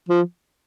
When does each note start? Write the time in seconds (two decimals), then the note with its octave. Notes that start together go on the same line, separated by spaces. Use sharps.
0.09 F3